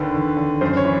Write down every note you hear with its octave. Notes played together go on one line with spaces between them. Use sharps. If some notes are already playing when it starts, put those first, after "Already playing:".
Already playing: D#2 D3 B4
D3
D3
F#2 C5
C#5
E3